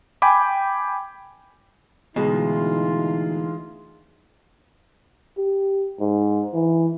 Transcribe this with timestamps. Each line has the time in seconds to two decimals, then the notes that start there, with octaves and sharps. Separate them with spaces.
0.22 G5 G#5 B5 D6
2.16 D2 B2 E3 G#3 D#4 F4
5.38 G4
6.00 G#2
6.53 E3